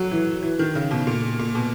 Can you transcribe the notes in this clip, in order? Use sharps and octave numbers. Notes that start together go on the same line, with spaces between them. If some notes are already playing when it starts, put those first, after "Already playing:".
Already playing: F#3
E3
E3
D#3
C#3
B2
A#2
A#2
B2